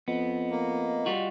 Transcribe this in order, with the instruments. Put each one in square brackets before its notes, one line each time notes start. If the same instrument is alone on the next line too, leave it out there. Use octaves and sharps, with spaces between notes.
[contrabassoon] F2 [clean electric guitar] B3 [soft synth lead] D#5
[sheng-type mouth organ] A#3
[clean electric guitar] G3 F4 F#4